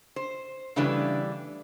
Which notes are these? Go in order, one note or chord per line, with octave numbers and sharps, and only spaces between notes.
C5
C#3 E3 G3 A3 D4 B4